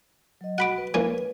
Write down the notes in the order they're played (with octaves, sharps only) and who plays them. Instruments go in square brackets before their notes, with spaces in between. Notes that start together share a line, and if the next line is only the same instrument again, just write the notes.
[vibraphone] F#3 D#5
[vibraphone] F#4 [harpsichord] F#5 B5 D6
[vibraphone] B4
[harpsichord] E3 A#3 C#4